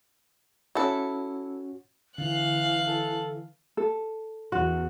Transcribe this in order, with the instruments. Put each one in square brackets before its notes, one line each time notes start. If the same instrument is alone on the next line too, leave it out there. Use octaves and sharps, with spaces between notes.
[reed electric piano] C#4 F#4 [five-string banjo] E4 A4
[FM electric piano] D3 [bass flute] E3 [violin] F5 F#6
[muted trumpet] A4
[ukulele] A4
[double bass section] E2 [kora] F#4